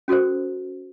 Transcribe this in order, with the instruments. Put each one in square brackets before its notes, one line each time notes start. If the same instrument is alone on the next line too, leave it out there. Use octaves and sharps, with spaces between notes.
[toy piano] C#4 F#4 A4 A#4 C5